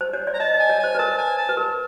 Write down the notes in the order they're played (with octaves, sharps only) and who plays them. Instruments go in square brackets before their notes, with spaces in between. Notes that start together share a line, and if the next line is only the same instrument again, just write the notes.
[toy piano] C5
C#5
D5
[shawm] A#5
[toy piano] D#5 [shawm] A5
[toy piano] D#5
[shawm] G#5
[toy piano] C#5
[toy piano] C5 [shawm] G#5
[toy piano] B4
[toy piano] A#4 [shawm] A5
[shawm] G#5
A5
[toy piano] B4
A#4